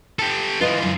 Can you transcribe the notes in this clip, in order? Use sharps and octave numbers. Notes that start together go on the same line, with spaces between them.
G4 A4
E3 F4 B4 D#5
F#2